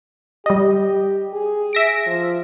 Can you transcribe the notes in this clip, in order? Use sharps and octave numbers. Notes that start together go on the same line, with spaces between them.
G3 G4 D#5
G#4
E5 A#6 D7
F3